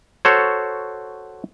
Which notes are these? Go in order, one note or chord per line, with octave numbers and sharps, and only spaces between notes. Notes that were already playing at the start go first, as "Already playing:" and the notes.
F#4 A4 C5 C#5